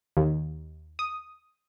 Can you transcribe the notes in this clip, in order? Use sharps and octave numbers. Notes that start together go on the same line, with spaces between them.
D#2
D#6